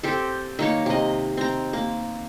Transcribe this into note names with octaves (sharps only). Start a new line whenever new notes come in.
C4 G4 A4
D#3 A#3 C#5
C3 D#5
C4 A#5
A#3